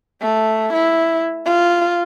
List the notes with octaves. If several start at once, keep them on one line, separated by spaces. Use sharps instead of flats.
A3
E4
F4